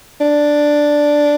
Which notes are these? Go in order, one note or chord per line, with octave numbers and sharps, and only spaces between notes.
D4